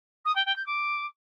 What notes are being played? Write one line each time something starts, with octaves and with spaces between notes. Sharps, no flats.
D#6
G5
G5
G6
D6